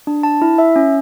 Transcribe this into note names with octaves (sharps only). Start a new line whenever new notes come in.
D4
A5
E4
E5
C#4